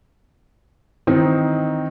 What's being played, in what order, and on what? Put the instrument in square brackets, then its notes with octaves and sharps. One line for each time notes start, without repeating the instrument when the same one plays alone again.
[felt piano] D#3 E3 C4 D#4